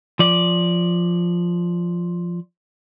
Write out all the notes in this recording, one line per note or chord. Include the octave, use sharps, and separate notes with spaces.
F3 D5